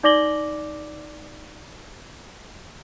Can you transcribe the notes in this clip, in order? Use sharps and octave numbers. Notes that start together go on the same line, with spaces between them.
D#4 D5 D6 A#6 F#7 G7